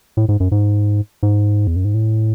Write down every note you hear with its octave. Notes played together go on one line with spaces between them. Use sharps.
A2
G#2
F#2
G#2
G#2
E2
F#2
G#2
A2